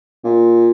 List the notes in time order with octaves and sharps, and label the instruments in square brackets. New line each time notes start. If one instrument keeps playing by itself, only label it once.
[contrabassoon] A#2